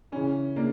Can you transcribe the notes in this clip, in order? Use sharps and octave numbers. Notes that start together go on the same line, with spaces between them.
C#3 E3 C#4
C#3 A#3 D4